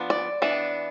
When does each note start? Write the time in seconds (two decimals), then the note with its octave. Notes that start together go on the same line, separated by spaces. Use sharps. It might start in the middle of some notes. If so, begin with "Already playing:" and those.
Already playing: F3 B3 D4
0.10 D5
0.42 E3 B3 D4